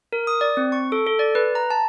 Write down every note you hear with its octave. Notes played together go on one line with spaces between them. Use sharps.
A#4
D#6
D5
C4
C#6
A4
A4
D5
B4
A#5
A5